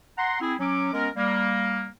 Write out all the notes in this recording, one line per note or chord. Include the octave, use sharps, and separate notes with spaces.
F#5 A#5 C6
C4 E4 G#4
F#3 C#4 D6
G#3 B3 C#4 A#4
G3 A#3